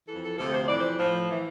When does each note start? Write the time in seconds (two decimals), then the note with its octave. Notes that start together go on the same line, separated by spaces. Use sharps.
0.08 F2 E3 A4
0.23 A4
0.38 D2 C3 F3 A4
0.54 C5
0.68 F2 E3 D5
0.79 C5
0.98 A2 F3
1.31 E3